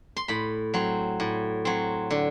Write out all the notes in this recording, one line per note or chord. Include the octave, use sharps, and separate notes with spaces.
C6
A2 B5
F#3 C4
A2
F#3 C4
D3